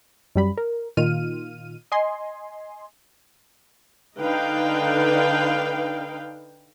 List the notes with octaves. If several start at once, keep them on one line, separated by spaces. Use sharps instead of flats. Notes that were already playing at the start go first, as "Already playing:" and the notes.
F#2 G3 B5
A#4
A#2 D#3 F4 F6 D#7
D#5 G#5 C6
D3 D4 D#4 B4 F5 G5